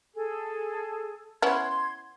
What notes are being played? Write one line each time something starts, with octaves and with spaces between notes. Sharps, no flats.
G#4 A4
B3 C#4 E4 C6 G#6